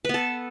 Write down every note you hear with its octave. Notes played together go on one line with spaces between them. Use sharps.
B3 A4 B4